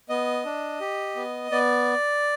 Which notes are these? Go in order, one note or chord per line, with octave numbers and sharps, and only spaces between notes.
B3 D#5
D4
G4
B3
B3 D5